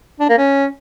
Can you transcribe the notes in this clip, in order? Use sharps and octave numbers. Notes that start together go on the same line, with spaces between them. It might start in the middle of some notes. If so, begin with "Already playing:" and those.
D4
A#3
C#4